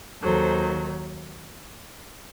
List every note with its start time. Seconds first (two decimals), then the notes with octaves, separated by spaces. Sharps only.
0.23 D#2 D#3 F#3 A4 C5